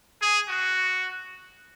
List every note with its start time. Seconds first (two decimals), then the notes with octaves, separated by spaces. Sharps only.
0.20 G#4
0.49 F#4